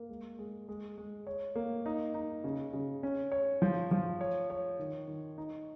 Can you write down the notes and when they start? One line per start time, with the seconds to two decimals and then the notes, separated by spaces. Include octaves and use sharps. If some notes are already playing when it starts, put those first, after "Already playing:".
Already playing: A#3
0.09 G#3
0.39 G#3
0.68 G#3
0.98 G#3
1.27 C#5
1.56 A#3
1.86 D#4
2.14 D#4
2.44 C#3
2.73 C#3
3.03 C#4
3.32 C#5
3.62 F3
3.91 F3
4.21 C#5
4.50 C#5
4.79 D#3
5.08 D#3
5.38 D#4